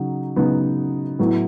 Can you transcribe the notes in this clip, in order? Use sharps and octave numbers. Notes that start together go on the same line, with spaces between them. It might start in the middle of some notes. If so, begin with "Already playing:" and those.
Already playing: C#3 F#3 D#4
C#3 F#3 B3 D#4
A2 F#3 B3 E4